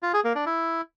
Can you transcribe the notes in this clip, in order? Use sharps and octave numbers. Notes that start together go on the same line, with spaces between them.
F4
G#4
A#3
D4
E4